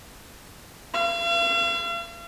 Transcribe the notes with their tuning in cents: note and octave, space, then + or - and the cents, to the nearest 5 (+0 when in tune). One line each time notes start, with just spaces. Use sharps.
F5 -40